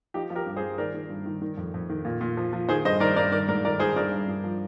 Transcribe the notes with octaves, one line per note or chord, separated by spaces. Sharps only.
F3 D#4 G4
F3
G4 A#4
G2
G#4 C5
G2
D#3 A#4 D5
D#3
G2
D#3
D#3
F2
F2
D#3
A#2
A#2
F3
F3
D#3 G#4 C5
G2 C5 D#5
D#3 A#4 D5
G2 A#4 D5
D#3 A#4 D5
G#2 A#4 D5
D#3 A#4 D5
D#3 G#4 C5
G2 A#4 D5
G2
G2
F3